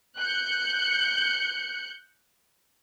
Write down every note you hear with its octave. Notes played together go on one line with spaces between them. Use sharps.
F#6 G6 C#7